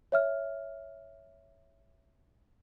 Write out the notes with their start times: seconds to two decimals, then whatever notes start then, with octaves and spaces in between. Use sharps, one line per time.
0.12 C#5 E5 F6